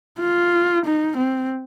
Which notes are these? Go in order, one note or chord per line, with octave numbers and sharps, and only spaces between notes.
F4
D#4
C4